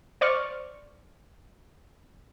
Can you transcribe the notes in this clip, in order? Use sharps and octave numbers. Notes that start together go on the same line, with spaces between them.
C5 D5 C#6 F6